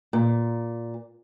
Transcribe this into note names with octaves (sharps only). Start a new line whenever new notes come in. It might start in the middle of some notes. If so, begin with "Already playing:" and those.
A#2